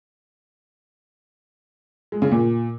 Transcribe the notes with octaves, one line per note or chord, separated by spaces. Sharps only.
G#3
C#3
A#2